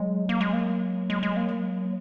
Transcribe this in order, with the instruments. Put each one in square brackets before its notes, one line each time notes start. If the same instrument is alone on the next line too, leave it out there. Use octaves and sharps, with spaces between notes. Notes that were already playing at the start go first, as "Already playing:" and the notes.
Already playing: [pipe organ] F#3 [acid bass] G#3
[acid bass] A#3
G#3
A#3
G#3
G#3
A#3
[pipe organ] F#3